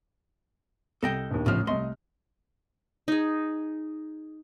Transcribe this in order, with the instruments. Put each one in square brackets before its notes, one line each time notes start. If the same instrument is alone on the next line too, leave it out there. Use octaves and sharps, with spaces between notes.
[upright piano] C2 [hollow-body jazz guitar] A4 D#5 G5
[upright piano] A#1 D#2
[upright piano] A1 F6 [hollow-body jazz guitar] A2 C#3 F3
[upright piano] C2 D#5 [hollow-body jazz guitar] A3 C6
[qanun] D#4 G#4